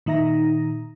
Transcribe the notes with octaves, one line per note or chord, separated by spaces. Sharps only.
A#2 D#3 D#4 E5 A#5 A#6